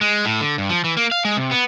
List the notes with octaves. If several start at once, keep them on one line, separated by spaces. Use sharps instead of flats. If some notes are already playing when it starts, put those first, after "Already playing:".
G#3
A2
D3
G2
F3
E3
A#3
F5
G#3
C3
B3